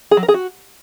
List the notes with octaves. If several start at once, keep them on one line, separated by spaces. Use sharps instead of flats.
G#4
F#3
A#4
G#4
F#4